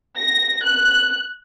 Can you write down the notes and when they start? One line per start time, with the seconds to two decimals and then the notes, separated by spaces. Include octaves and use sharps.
0.17 A#6
0.64 F#6